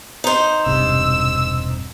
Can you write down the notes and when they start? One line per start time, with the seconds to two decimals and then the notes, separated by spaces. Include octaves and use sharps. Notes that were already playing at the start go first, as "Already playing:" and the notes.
0.24 D#4 C5
0.66 E1 G2 C3 E6